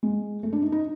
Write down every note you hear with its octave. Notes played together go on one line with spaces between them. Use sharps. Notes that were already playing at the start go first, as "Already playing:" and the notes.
G#3
A3
D4
D#4
D#4